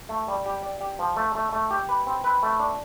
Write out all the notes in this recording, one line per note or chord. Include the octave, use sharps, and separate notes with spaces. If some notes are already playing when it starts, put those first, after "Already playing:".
A3
G3
G4
D5
G4
F3
A3
A3
A3
G4
B4
C4
B4
A3
D4